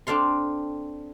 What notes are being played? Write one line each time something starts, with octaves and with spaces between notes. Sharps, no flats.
C4 D4 A4 F5 C6